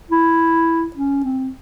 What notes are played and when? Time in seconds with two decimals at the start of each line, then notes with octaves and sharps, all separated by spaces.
0.11 E4
0.96 C#4
1.24 C4